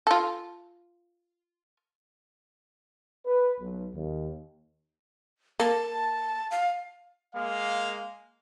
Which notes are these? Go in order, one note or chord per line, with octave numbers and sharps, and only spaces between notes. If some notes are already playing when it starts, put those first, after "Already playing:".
F4 A4
B4
B1
D#2
A#3 A5
F5
G#3 A#3 F5